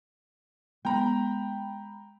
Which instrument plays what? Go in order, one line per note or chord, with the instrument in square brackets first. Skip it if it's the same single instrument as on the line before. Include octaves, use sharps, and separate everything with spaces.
[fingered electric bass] G#3 B3 [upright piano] G5 A#5 B5